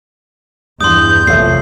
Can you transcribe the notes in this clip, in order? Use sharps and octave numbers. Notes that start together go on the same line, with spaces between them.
E2 G2 C6 D#6 G6
F1 A#1 F3 C#5 E5 C7